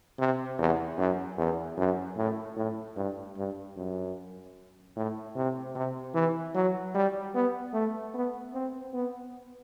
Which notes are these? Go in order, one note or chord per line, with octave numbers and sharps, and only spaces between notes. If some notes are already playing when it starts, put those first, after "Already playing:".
C3
E2
F#2
E2
F#2
A2
A2
G2
G2
F#2
A2
C3
C3
E3
F#3
G3
B3
A3
B3
C4
B3